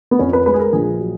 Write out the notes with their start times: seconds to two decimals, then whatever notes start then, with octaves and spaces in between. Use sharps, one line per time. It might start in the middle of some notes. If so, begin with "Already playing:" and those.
0.11 B3
0.19 F2 C#4
0.33 B4
0.46 G#3 B4
0.54 G#4
0.59 A#4
0.73 A#1 G#4
0.99 F#3